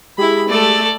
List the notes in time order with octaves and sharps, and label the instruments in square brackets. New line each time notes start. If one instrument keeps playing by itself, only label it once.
[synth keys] G#3 G4 G#4 [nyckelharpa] E4 B5
[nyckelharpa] A3 [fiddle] A4 D5